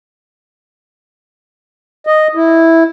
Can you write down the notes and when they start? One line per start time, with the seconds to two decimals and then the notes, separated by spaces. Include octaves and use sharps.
2.07 D#5
2.35 E4